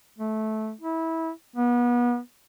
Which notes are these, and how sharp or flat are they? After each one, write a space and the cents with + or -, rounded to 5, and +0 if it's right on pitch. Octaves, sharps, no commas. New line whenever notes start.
A3 -15
E4 -20
B3 -30